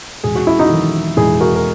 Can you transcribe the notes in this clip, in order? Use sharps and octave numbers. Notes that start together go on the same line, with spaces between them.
E1 G#4
F#4
E4
D#4 F#4
E2 D#3 F#3
E1 E4 G#4
F#4 A#4
A#4